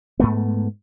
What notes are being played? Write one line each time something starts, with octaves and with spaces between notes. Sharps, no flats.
G#2 A3 B3